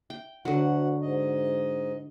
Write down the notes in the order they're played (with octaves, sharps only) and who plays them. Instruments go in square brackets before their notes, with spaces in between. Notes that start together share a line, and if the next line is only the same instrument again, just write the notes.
[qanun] G5
[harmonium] D2 F#5 [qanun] D3 F#3
[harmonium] G#2 D#5